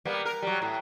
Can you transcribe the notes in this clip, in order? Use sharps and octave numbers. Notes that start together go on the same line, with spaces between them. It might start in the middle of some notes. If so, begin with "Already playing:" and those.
G3 A#3 B3
A#4
F#3 G3
A2